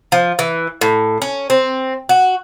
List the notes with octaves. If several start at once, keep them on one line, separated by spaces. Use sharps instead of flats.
F3
E3
A2
C#4
C4
F#4